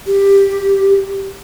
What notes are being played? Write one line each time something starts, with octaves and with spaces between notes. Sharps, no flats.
G4